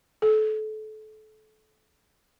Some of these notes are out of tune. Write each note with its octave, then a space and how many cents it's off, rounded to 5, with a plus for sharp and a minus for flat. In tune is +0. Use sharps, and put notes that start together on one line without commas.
A4 -30